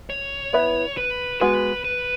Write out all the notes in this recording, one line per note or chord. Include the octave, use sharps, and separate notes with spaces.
C#5
B3 E4 B4 E5
B4
G#3 B3 F#4 B4
B4